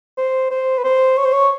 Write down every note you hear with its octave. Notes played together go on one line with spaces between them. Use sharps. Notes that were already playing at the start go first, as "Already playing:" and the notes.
C5
C5
B4
C5
C#5
C5
C#5